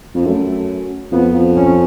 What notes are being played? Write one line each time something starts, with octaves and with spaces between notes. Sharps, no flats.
F2
F#2 A3
F2 B3
F2
C#4